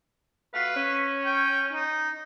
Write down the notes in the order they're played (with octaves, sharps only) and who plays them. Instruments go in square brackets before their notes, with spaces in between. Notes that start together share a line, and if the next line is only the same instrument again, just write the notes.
[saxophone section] A3 F#4 F5 [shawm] B4
[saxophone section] C#4
[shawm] G5
D#4